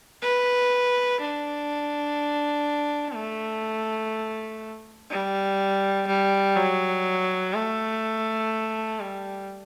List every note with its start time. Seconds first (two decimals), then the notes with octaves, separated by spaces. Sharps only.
0.23 B4
1.21 D4
3.15 A3
5.10 G3
6.07 G3
6.56 F#3
7.54 A3
9.00 G3